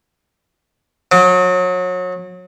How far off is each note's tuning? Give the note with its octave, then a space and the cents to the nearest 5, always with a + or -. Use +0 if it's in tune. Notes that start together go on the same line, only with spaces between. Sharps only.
F#3 -30